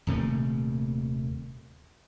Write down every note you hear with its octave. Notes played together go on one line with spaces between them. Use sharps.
D#1 C3 A3 A#3